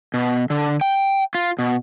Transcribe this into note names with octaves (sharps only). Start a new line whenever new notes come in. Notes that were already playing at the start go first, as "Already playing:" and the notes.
B2
D3
G5
F4
B2